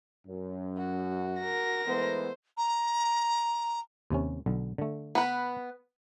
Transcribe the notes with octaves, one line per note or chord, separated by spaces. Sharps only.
F#2
F#4
A#4 A#6
E3 G#3 A3 B3 C5
A#5
D#2 C3 C#4
B1 D3
D3 A3
B3 B4